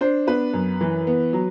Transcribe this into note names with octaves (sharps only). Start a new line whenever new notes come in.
D4 C5
B3 B4
F#2
E3
B3
F#3